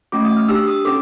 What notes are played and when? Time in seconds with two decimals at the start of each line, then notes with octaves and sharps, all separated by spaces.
0.12 A3 C#4 F#4 D6
0.25 D#6
0.37 F6
0.49 D4 G4 E6
0.67 D#6
0.85 C#4 F#4 A4 D6